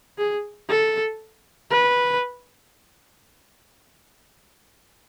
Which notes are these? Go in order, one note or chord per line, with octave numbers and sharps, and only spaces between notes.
G#4
A4
B4